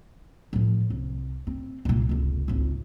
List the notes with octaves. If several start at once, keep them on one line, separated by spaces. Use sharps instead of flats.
A2 F3
C2
C4
C2 A#2
F1 C#2
G#1 C#2